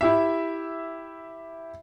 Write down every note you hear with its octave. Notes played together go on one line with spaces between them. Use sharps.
E4 G4 E5